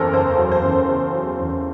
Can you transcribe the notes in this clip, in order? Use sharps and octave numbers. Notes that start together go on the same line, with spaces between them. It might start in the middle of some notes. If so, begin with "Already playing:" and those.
Already playing: F#1 E2 A4 A#4 C5
C#3 C5
F#3
C5
E2
C#3
F#3
E2